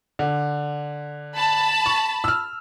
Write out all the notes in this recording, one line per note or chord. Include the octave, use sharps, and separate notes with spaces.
D3
A5 B5
C#6
E6 F6